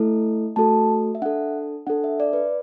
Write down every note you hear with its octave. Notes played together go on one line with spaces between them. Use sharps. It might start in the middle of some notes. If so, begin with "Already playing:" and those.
Already playing: A3 E4 A4
A3 F#4 A4 A5
E5
D4 A4 F#5
D4 A4 F#5
E5
D5
B4